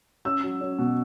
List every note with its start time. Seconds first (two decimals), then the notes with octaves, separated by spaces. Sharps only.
0.25 C#4 E6
0.43 F#3
0.61 C#4
0.79 B2